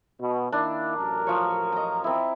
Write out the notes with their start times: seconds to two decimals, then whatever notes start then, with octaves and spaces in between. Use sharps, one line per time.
0.21 B2
0.52 D#3 A#3 D4 E4
0.97 A1 F#2 A#4
1.27 F3 C#5
1.72 D#5 A#5
2.04 C4 E4